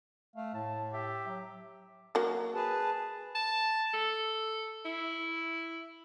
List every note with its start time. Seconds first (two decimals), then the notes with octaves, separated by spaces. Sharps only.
0.36 A3 F5
0.54 A2 A5
0.93 G4 E5
1.27 F#3
2.15 F#3 A#3
2.55 G#4 B4 A5
3.35 A5
3.94 A4
4.85 E4